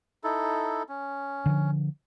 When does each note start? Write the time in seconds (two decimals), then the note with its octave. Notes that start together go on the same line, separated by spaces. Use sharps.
0.24 D#4 E4 A4
0.89 C#4
1.46 D3 F3